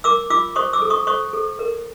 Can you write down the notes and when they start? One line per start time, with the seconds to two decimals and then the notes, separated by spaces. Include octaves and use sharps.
0.04 A#4 D6 E6
0.30 F4 D6 E6
0.56 C5 C#6 D#6
0.73 D6 E6
0.82 A4
0.90 C#6 D#6
1.07 C5 C#6 D#6
1.33 A4
1.59 A#4